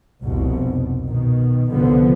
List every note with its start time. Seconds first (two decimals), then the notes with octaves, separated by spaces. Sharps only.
0.22 F1 C2 B2
1.04 B2 D#3
1.70 C2 D3 F3 B3